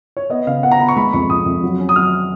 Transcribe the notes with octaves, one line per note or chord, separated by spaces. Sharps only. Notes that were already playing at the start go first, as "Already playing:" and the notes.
C#5
B3 D#5
C#3 F5
B3 F#5
A#5
B3 B5
C#6
G#3 B5
F2 C#6
F2 D#6
F2
F#3
C#4
D#6
F#3 F6